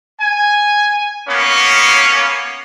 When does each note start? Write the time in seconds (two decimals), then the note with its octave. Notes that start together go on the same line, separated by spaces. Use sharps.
0.19 G#5
1.27 A#3 B3 C#4